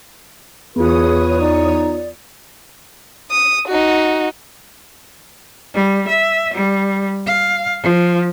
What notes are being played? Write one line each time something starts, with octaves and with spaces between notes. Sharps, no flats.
E2 B3 F4 G#4 B4 C#5 D#6
D#4 D5
D#6
D#4 F#4
G3
E5
G3
F5
F3